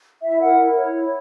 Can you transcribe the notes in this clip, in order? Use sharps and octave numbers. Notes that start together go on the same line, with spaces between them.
E4 E5
A#4 F#5
E4
C#5
E4